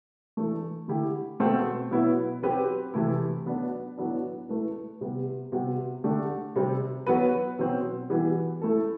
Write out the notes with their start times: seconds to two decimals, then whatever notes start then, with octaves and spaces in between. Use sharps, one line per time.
0.37 E3 A3 D4
0.88 D3 A3 E4 G4
1.40 B2 A3 C4 F#4 C5
1.91 B2 F#3 B3 E4
2.42 F#3 C4 G4 B4
2.94 C3 E3 A3 E4
3.46 F#3 B3 D4
3.97 A2 F#3 B3 D4
4.49 A3 E4 B4
5.01 C3 G3 B3
5.52 C3 G3 B3 F#4
6.04 D3 A3 D4 G4
6.56 C3 G3 C4
7.07 F#3 B3 F#4 B4
7.59 B2 F#3 C4
8.10 E3 G3 B3 F#4 B4
8.62 A3 E4 A4